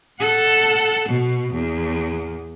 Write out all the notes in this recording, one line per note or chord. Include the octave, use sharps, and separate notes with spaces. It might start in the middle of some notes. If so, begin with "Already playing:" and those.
A4 F#5
B2
E2